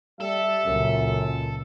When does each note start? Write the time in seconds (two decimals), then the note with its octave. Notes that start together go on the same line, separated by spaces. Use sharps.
0.21 G3 A4 E5
0.65 C#2 F#2 A#2